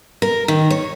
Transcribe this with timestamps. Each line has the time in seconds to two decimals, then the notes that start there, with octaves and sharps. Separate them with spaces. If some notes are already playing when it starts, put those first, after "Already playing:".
0.22 A#4
0.48 D#3
0.70 C#5